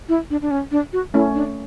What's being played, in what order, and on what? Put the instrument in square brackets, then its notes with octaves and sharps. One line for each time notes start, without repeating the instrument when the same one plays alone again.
[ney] E4
D4
D4
C#4
D4
F#4
[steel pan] A3 C#4 [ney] E4
[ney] D4